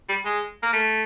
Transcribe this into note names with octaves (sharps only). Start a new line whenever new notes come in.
G3
G#3
A#3
A3